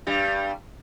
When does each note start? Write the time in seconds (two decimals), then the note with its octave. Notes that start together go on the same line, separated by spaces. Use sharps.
0.07 G2 G3